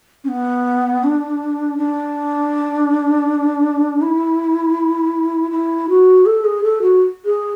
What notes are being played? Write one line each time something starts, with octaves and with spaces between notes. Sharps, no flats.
C#4
B3
D4
D4
E4
E4
F#4
A4
G#4
A4
F#4
G#4